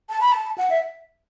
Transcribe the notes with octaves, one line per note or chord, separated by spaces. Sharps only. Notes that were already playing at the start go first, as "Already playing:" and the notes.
A5
B5
A5
F#5
E5